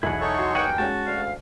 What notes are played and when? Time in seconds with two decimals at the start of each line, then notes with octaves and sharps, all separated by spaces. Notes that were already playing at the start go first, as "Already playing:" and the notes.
0.03 B1 E2 E4 G#4 F#5
0.21 D#4 A4 C#5 C#6
0.38 F#4 A4 C6
0.55 G2 A#3 F#4 G#4 F#5 G5
0.78 G#3 C#4 F#4 A5
1.06 D2 F5